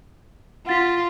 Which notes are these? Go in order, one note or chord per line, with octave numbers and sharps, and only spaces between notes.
F4 F#5 A6 B6